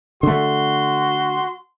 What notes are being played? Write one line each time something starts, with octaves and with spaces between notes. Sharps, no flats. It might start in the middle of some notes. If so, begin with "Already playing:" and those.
D3 A3 F#4 C6